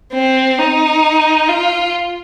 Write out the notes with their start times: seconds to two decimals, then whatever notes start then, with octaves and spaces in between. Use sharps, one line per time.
0.14 C4
0.59 D#4
1.49 F4